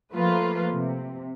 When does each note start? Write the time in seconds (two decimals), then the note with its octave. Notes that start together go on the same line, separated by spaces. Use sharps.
0.13 F3 A3 A#3 F4 B4
0.73 C3